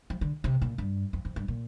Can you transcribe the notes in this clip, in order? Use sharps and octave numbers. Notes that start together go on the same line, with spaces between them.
F3
D3
C3
A#2
G2
F2
F2
G2
A#2